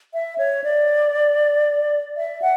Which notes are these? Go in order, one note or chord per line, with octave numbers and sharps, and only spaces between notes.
E5
C#5
D5
E5
F#5